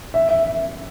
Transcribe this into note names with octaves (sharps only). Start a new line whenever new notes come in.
E5
E5